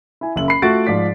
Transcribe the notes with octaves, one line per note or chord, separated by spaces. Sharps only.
E4 G#5
F#1 E5 F#7
B5 C7
A3 F4 F#4 A6 D7
G#2 F3 D5 B6